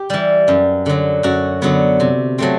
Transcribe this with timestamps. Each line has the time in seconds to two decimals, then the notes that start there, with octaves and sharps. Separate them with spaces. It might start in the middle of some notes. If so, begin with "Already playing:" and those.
Already playing: G4
0.10 E3 G3
0.48 F#2
0.86 D3 F#3
1.23 F#2 F#4
1.62 D3 F#3 B3
2.00 C3
2.38 F#3 A3 C4